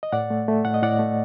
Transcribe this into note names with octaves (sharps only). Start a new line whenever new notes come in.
D#5
A2 D5 F#5
A3
A3
A2 F#5
D#5
A2 D5 F#5
A3